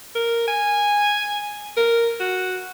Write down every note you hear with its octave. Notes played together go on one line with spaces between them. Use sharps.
A#4
G#5
A#4
F#4